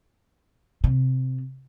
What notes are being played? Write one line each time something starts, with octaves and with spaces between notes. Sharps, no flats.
C3